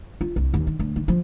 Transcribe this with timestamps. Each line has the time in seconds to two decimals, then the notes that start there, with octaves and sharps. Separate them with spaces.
0.21 F4
0.36 C2
0.54 D#2
0.67 D#3
0.79 D2
0.96 D#3
1.08 F3